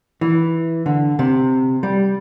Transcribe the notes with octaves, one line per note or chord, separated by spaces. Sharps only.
E3
D3
C3
G3